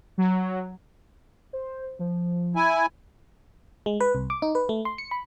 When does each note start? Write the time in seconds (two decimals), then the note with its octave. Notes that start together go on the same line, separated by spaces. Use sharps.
0.18 F#3
1.53 C5
1.99 F3
2.56 E4 G#5
3.86 G#3
4.01 B4
4.15 C2
4.30 D6
4.42 D#4
4.55 B4
4.69 A3
4.85 C6
4.98 C#7
5.11 B5